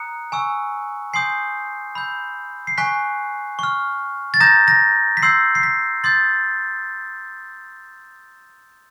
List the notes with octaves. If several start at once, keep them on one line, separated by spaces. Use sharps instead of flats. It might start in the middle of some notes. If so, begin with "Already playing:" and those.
Already playing: A#5 D#6 F#6 C#7
G#5 C#6 E6
G#5 C6 D#6 G6 C7
B5 E6 G6
C7
G#5 C#6 F#6 B6
C#6 F6
A6
A#5 D#6 G6 A#6
A#6
B6
C6 E6 G6 C7
C7
B6
C6 D#6 G6 A6